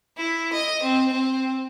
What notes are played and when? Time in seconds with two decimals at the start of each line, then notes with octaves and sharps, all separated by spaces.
0.17 E4
0.53 D#5
0.82 C4
1.12 C4